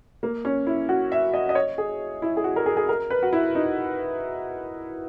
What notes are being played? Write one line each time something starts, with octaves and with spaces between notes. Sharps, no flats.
A#3
C#4
E4
F#4
E5
D#5
D#5
C#5
G#4
E4
G#4
F#4
A#4
G#4
G#4
A#4
B4
F#4
E4
D#4